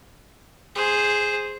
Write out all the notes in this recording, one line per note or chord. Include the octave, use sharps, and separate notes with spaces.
G#4 C5